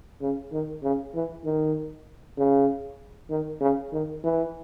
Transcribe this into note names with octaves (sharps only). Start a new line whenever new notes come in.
C#3
D#3
C#3
E3
D#3
C#3
D#3
C#3
D#3
E3